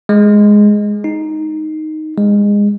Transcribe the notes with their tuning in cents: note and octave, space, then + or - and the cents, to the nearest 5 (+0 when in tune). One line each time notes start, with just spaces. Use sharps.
G#3 +0
D#4 +0
G#3 -20